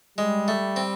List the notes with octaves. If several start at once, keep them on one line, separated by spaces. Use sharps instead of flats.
G3 G#3
A3
C4